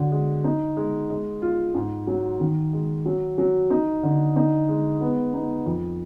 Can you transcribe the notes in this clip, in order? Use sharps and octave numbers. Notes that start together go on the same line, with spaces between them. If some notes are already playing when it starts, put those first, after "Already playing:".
Already playing: D3 F#3
G#3
D#4
G#3
G#3
F4
G#2
F#3
D#3
G#3
F#3
F#3
D#4
D3
D#4
G#3
B3
D#4
F2